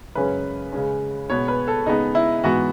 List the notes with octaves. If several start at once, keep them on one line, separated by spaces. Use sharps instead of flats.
F#2 C#3 G#3 C#4 B4
C#3 G#3 C#4
B2 G#3 B3 C#5
B4
A4
C#3 G#3 B3 D#4
E4
G#2 E3 B3 F#4